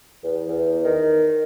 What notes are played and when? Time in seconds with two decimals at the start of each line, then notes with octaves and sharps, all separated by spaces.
0.23 E2
0.48 E2
0.84 D#3